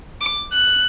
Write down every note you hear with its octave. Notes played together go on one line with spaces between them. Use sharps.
D6
F#6